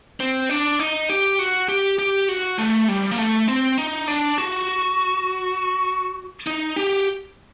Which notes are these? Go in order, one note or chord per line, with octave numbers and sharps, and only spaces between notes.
C4
D4
D#4
G4
F#4
G4
G4
F#4
A3
G3
A#3
A3
C4
D#4
D4
F#4
D#4
G4